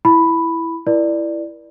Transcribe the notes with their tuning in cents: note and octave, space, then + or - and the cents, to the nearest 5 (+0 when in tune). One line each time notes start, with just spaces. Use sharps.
E4 +0 B5 +0
E4 +10 A#4 +45 D5 +10